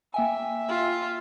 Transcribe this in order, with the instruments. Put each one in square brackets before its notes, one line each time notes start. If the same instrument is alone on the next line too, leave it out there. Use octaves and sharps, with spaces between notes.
[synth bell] A#3 G5 G#5 [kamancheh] E5
[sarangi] F4